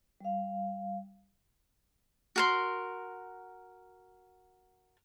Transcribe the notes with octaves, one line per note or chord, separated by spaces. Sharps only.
G3 F5
F#4 A#4 C6